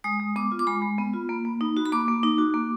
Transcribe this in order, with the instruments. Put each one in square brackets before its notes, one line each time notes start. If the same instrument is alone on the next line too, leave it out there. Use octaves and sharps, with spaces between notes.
[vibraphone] G#3 D#6
G#3
B3 D6
F4
D6
G#3 B5
G#3
B3
F4
A#3
A#3
D#4
F#4
B5
A#3 D6
A#3
D#4
F#4
A#3